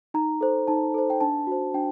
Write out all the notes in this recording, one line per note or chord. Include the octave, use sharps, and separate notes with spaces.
D#4 A#5
A4 C5
D#4 A5
A4 C5
G5
D4 A5
F#4 C5
D4 G5